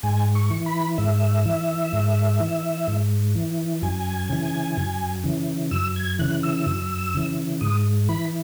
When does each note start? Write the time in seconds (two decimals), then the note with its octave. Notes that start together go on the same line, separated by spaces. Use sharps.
0.03 G#2 G#5
0.35 C#6
0.50 E3
0.66 B5
0.98 G#2 E5
1.45 E3
1.93 G#2
2.40 E3
2.88 G#2
3.35 E3
3.82 F#2 G#5
4.30 C#3 E3
4.77 F#2
5.24 C#3 E3
5.71 F#2 E6
5.96 G#6
6.19 C#3 E3 F#6
6.43 E6
6.67 F#2
7.15 C#3 E3
7.61 G#2 D#6
8.09 E3 B5